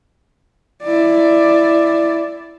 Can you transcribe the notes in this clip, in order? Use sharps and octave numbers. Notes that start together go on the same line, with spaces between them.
E4 D5